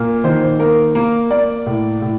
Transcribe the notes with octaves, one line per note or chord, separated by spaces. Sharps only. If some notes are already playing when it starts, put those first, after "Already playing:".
Already playing: A#2 A#3
D#3 C5
A#3 A#4
A#3 A#4
A#3 D5
A2
A2